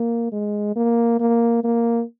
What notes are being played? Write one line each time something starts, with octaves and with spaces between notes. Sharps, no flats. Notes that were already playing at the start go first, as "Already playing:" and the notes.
Already playing: A#3
G#3
A#3
A#3
A#3